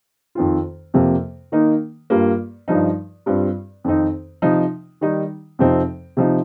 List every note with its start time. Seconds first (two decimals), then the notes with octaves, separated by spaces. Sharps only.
0.35 F2 D#3 C4 F4
0.94 F2 C3 F3 A#3
1.52 D#3 A#3 D#4
2.10 G2 G3 A#3 F4
2.68 G2 F3 D#4
3.26 G2 G3 C4 F4
3.84 F2 D#3 C4 D#4
4.42 C3 F3 D#4
5.01 D#3 G3 D#4
5.59 F2 C3 F3 C4 D#4
6.17 C3 F3 D#4